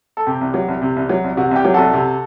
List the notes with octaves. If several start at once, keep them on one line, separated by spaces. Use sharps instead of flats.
A4
C3 G4
C2
F#3
C2
C3
C2
F#3
C2
C3 F#4
C2 G4
F#3
C2 F#4 A4
C3